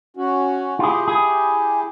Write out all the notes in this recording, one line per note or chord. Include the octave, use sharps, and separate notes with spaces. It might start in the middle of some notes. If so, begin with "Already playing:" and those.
C#4 F#4
E4 F4 G4 G#4
G#4